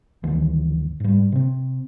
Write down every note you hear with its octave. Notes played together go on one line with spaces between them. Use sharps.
G1 D2 D#3 E3
G#2 G3
C3 C4